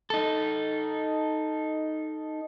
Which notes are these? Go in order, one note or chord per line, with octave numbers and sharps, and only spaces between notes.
D#4 A4